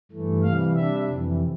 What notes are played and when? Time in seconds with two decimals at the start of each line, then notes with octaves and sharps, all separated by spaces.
0.11 G2 E3 A3
0.43 C3 E3 G3 F5
0.76 C3 G3 D4 E5
1.09 F2 C3 E3